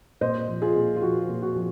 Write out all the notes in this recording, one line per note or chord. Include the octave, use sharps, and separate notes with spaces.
A#2 C5 D#5
F3
F4 G#4
A#2
F4
F3 F#4
A#2
F#4
F3